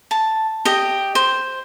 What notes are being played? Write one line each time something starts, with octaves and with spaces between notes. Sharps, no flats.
A5
G4 D#5
C5